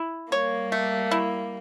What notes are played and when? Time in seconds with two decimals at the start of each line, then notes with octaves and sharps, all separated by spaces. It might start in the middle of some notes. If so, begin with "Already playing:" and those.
Already playing: E4
0.32 G3 A#3 C#5
0.72 A3
1.11 E4